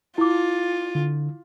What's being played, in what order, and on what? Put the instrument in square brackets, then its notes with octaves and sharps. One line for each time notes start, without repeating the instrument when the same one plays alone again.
[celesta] E4 D6 [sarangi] F4
[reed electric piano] D3